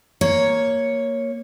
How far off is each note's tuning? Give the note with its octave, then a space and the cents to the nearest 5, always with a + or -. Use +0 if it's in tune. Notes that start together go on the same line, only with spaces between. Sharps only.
A#3 +0 C#5 +0